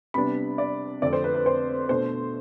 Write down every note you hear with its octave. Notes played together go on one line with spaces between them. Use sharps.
C3 G3 B3 D4 B5
D5
F2 D3 A3 C4 D5
C5
B4
B4
C5
B2 A3 D4 C5